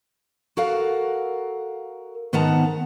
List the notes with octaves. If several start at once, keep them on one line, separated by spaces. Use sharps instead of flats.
F#4 A4 A#4 F5 F#5
G#2 D#3 B3 F#5 A5 A#5